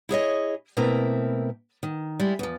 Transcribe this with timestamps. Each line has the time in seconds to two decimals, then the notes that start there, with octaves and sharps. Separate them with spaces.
0.09 E4 G#4 C#5 D#5
0.77 B2 A3 A#3 C4 E4 A#4
1.83 D#3
2.20 G3 G#3 E4
2.39 E2 F3